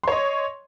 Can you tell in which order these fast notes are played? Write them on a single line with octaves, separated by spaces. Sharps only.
C6 C#5 D#5